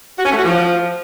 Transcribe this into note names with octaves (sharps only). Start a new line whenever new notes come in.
F#4
C#4
A3
F#4
F3